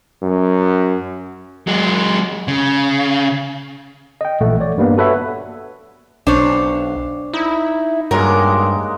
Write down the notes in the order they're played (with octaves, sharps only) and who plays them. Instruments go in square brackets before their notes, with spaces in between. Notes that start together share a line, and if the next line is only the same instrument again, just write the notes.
[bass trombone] F#2
[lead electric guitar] F#3 G#3
C#3
[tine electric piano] D#5 G5
A#1 A#2 E3 A3 F#5
C#5 D5
G2 G3 A#3 B3
F#4 A4 B4 C#5 E5 F#5
[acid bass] B1 [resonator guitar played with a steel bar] D4 C5 C#5
[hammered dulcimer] D#4 [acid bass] E4
[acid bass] G2 [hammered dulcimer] F#3 G#3 A#3 [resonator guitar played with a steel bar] A#4